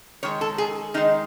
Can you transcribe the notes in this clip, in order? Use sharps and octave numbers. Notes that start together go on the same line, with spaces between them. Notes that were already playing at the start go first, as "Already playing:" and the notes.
D#3 G#3 C#5
A4
G#4
D#3 G#3 D#4